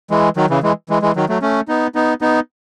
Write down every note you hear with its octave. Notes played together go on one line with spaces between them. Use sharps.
E3 G#3
D#3 F#3
C#3 E3
E3 G#3
E3 G#3
E3 G#3
D#3 F#3
F#3 A3
A3 C#4
B3 D#4
B3 D#4
B3 D#4